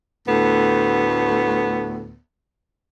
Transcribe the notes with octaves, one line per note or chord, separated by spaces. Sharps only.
D2 A2 B3